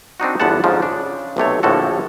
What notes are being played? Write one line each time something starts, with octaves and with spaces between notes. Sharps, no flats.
C4 D4 D#4 F#4
G1 E2 D3 B3 F#5 A5
F2 G#2 F3 C#4
C#3 D4
B1 C3 A3 C#5
A#1 A2 D3 F3 F#4 A4